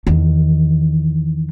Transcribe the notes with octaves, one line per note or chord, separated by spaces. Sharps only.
E2 D#3